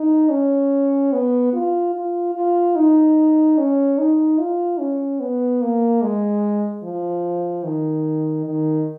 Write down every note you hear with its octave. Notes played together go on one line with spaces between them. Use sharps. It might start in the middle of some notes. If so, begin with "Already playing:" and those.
Already playing: D#4
C#4
B3
F4
F4
F4
D#4
C#4
D#4
F4
C#4
B3
A#3
G#3
F3
D#3
D#3